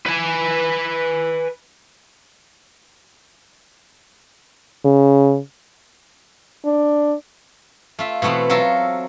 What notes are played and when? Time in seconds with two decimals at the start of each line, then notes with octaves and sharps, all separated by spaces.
0.06 B4 G#5
4.85 C#3
6.65 D4
7.99 A3 F4 E5
8.22 B2 E3 A3 B3 C4
8.49 F#3 F4 A4 A#4 E5